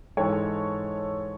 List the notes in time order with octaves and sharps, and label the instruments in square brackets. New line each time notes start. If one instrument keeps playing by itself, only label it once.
[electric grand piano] G#2 E3 G#3 [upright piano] A4 C#5